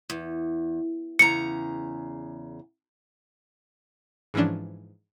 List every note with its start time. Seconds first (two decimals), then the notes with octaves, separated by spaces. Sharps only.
0.10 E2
1.19 E2 C#3 A#5 C#7
4.34 G#2 E3 F3 C#4 D4